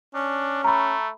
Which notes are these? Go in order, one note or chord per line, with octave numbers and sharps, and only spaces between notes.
C#4 D4
A3 A#5 B5